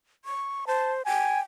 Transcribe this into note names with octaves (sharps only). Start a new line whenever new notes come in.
C#6
C5 A5
G5 G#5